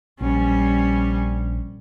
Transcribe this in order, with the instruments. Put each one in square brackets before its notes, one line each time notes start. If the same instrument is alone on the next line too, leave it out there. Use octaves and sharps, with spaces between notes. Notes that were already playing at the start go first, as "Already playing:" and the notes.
[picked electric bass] A#1 [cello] G3 C#4